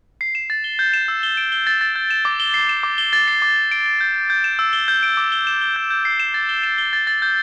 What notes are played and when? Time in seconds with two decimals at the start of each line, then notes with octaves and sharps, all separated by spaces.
0.21 C7
0.35 E7
0.50 A6
0.64 G7
0.79 G6
0.93 E7
1.08 E6
1.23 G7
1.37 D7
1.52 G7
1.67 A6
1.81 A6
1.95 G6
2.10 E7
2.25 D6
2.40 G7
2.54 C7
2.69 E7
2.83 D6
2.98 G7
3.13 A6
3.28 C7
3.42 D6
3.56 G7
3.71 D7
3.86 G7
4.01 G6
4.15 G6
4.30 G6
4.44 E7
4.59 E6
4.73 G7
4.88 G6
5.03 D7
5.17 D6
5.32 G7
5.47 E7
5.61 G7
5.76 G6
5.90 G6
6.05 C7
6.20 E7
6.34 A6
6.49 G7
6.63 E7
6.78 G7
6.93 A6
7.07 A6
7.22 G6